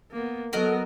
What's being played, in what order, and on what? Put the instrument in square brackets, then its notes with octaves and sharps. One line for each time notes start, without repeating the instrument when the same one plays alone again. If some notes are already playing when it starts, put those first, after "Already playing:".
[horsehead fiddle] A#3 B3
[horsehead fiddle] F#3 B3 [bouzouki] F#4 A#4 D#5 [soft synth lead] A4